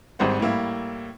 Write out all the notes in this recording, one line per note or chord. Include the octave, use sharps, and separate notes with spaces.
G#1 G#2 G3 C5 F#5
A2 G3 A#3 E4